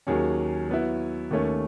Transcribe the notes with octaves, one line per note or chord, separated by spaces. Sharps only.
D#2 D#3 F#3 C#4 G#4
F#3 B3 E4
D#2 D#3 A3 C#4